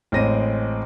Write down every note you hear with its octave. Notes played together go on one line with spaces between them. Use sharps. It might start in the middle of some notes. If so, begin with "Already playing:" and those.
A1 G#3 C4 A#6 D#7